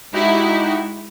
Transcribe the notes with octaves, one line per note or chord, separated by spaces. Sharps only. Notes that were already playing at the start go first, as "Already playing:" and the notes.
G#3 D#4 E4 F#4 G4